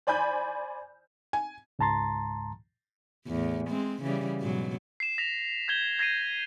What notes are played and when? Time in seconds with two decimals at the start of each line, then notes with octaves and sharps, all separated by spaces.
0.07 C5 D5 G#5 B5 G6
1.33 G#5
1.79 C#2 G#2 A5 A#5 C6 A6
3.27 E2 A2
3.68 G#3 C4
4.02 C#3 E3 G3
4.41 G#2 B2 F#3
5.00 C7 E7
5.18 A#6 B6 F7
5.68 G6 G#6 G7
5.99 G#6 A#6 C7 D#7